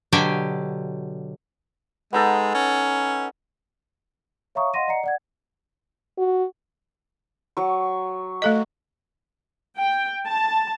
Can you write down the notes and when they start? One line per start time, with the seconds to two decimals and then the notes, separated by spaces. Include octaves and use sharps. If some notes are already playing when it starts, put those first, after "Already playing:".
0.12 B2 D3 F#3 G4 G5 G#5
2.13 G#3 B3 D#4 A4
2.54 C#4
4.55 C#5 E5 F5 A#5 C#6 D#6
4.74 D#5 F5 F#5 C6 A#6 D#7
4.87 D5 D#5 F#5 A#5 C7 C#7
5.04 D5 F#5 G#6
6.18 F#4
7.57 F#3 C#6
8.42 A3 A4 D#5
9.76 G5
10.28 A5